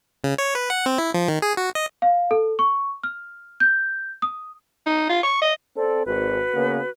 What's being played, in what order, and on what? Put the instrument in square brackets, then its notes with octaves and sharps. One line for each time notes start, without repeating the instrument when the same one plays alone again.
[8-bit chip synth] C#3
C#5
B4
F#5
C4
E4
F3
D#3
G#4
F#4
D#5
[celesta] F5
A4
C#6
F6
G6
D#6
[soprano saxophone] D#4
F4
C#6
D#5
[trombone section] C4 A4 [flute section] D5
[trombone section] G#1 [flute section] F#4 B4
[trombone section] C#3 A#3 B3